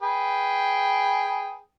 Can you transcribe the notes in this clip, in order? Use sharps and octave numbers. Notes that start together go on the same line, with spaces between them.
G#4 B4 G5